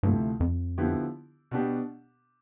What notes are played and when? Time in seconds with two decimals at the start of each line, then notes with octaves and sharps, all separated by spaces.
0.03 D2 G2 C3 F3 A3 E4
0.40 F2
0.78 D3 F3 B3 E4 G4
1.51 B2 B3 D4 G4